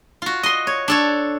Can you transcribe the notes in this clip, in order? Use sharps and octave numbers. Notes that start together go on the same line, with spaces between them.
F4 F#4
D#5 C6
C#5
D4 A4 C#5